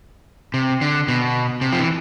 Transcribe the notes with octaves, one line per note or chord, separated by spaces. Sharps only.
C3
D3
B2
C3
F3
E3